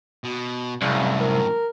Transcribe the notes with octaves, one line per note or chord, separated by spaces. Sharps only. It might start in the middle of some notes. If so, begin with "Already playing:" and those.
B2
C2 F#2 A2 C#3
A#4